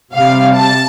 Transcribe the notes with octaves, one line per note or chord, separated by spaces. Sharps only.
C3 G3 F5
A5